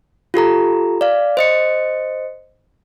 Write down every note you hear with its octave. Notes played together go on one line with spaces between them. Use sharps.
F4 G4 A4 A#5
D5 F5
C5 D#5 C#7